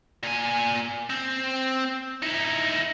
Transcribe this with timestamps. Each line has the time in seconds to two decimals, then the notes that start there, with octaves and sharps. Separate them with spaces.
0.23 A#2 G#5
1.10 C4
2.22 D#4 E4